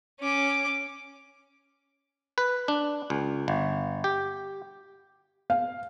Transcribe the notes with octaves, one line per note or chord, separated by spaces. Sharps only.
C#4 D6
B4
D4
C#2
G1
G4
F5